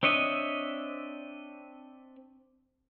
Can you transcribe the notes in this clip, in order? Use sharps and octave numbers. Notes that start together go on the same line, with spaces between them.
C4 D4 C#5 D#5 E5